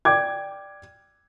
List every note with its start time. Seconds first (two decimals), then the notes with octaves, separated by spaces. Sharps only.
0.05 D5 G5 D6 G#6